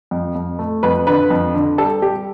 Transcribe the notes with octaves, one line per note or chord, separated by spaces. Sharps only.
F2
F2
A3
F2 B4
D3 B4
F2
D3
G3 A4
G3 G4